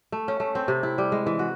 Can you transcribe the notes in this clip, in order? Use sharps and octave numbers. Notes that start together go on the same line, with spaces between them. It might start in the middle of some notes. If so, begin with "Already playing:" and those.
A3
C#4
A3
C4
C3
E4
G3
G#3
E3
F#4